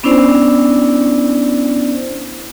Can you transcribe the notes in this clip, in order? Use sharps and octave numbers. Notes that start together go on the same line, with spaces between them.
B3 C#4 D4 E4 C5 D5